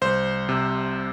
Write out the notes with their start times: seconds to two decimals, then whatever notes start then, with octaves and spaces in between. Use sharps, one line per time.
0.01 C2 C5
0.49 C3